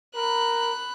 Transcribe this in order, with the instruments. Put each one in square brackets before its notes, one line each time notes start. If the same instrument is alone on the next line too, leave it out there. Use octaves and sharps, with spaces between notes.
[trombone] A#4 [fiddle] B5 F#6